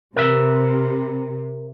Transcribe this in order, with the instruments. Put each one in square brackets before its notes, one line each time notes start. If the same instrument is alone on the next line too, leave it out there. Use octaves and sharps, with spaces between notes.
[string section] C3 [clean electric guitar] A#4 B4 E5